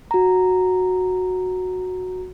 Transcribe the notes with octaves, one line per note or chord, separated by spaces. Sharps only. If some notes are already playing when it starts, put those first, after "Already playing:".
F#4 A#5